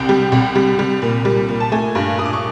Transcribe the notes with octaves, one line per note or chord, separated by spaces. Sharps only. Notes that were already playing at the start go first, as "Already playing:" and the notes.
Already playing: C2 G5
G3
C2
G3
G3
A#2
G3
A#2
A5
A3 G#5
G2
G2 D#6
D6
C#6